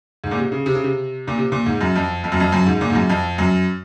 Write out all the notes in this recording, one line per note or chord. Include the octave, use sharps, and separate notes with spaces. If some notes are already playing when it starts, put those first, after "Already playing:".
G#2
A#2
C3
C#3
C3
C#3
C3
A#2
C3
A#2
G#2
F#2
F2
F2
F#2
F2
F#2
G#2
A#2
G#2
F#2
F2
F#2